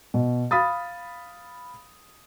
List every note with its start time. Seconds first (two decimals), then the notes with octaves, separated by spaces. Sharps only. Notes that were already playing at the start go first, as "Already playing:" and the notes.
0.14 B2
0.51 F5 B5 D#6 A6